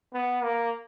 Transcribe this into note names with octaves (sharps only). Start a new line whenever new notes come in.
B3
A#3